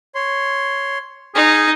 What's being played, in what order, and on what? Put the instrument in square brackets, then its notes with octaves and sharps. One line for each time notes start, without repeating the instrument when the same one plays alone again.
[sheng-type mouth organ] C#5 C6
[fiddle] D#4 [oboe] G#4 [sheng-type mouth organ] F6